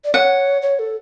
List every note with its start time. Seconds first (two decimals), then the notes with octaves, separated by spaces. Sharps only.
0.05 D5
0.14 C#5 F#5
0.62 C#5
0.79 A4